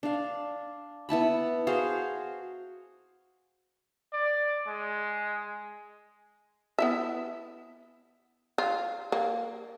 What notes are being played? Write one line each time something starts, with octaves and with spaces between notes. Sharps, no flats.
D4 F5
B3 E4 A5 B5
F#4 G#4 C5 F5
D5
G#3
B3 E4 E5
F4
A#3